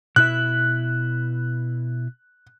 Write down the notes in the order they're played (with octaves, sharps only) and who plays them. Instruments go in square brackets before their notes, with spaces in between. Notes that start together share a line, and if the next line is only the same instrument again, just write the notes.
[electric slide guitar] B2 E4 E5 [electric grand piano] F#6